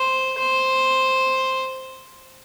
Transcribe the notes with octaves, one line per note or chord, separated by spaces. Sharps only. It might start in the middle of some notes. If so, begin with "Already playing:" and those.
Already playing: C5
C5